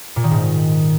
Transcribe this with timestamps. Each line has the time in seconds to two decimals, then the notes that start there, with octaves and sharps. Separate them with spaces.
0.16 A#2
0.24 D#3
0.31 G#2